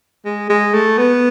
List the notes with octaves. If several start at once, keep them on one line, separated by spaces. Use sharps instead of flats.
G#3
G#3
A3
B3